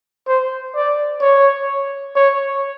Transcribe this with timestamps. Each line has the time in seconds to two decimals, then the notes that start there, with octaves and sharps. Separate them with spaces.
0.28 C5
0.76 D5
1.21 C#5
2.16 C#5